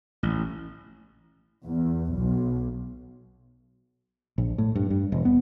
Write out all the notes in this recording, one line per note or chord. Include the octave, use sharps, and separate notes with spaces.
A1
E2
B1
A#1
A2
G2
G2
E1
B3